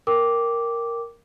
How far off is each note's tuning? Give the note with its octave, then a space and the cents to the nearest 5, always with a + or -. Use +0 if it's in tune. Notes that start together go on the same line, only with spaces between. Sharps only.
A#4 +0 G5 +0 D6 -5